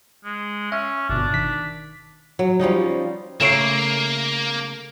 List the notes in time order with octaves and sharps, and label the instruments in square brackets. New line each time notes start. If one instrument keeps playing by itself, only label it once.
[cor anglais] G#3
[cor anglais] C#4 [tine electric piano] E5
[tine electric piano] G1 B2 [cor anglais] D4
[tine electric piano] D#3 B6
[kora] F#3
F3 G3 C#4 D#4
[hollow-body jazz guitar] C#3 A3 C#5 [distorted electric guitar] A#3 [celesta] C7 D7 E7